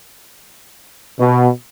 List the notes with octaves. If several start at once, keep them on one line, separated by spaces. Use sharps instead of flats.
B2